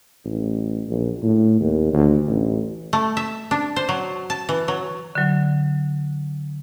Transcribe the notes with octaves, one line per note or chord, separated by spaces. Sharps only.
A1
A#1
A2
D#2
D2
A1
A3
E5
D4
C5
F#3
A5
E3
F#3
D3 F#3